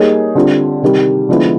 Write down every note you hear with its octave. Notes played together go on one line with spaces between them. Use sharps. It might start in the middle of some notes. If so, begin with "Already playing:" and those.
Already playing: G3 A#3 D#4 G#4 C#5
D3 G3 C4 F4
C3 D#3 G3
D3 F3 G#3 B3 E4